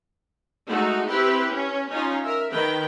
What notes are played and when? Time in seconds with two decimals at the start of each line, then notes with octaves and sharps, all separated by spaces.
0.68 G#3 A3 D#4 F#4
1.07 C4 E4 G4 B4
1.51 C#4
1.90 C#4 D#4 F4
2.22 A#4 E5
2.52 D#3 B4 G5